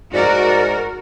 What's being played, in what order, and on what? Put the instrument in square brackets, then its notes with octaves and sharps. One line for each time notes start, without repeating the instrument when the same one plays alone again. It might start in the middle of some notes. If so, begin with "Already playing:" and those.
[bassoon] G#2 [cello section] F#4 A#4 [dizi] D5